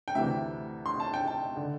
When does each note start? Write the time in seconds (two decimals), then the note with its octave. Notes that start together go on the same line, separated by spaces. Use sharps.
0.08 G5
0.15 D2 C3 E3 E5
0.86 C6
1.00 A5
1.14 G5
1.27 A5
1.57 D3